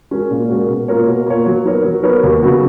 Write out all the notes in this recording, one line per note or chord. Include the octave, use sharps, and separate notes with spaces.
G#3 C#4 F#4 A#4
A#2
G#3 C#4 F#4 A#4
B2
A#3 F4 A#4 C#5
B2
A#3 F4 A#4 C#5
F#3
B3 D#4 A#4 C#5
F#3
B3 D#4 A#4 C#5
D#2
C#3 F#3 B3 F#4